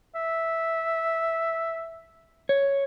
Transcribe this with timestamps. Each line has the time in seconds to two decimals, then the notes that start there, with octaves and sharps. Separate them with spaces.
0.15 E5
2.49 C#5